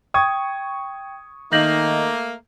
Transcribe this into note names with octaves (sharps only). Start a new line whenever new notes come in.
G5 C#6 D#6 G#6
D#3 A3 A#3 D#4 G6 A#6 F#7